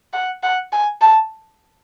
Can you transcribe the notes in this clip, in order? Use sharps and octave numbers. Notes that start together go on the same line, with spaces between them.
F#5
F#5
G#5
A5